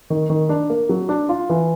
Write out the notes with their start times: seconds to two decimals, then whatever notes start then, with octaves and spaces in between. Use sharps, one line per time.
0.10 D#3
0.30 D#3
0.49 D4
0.70 A#3
0.89 F#3
1.09 D4
1.29 F4
1.50 E3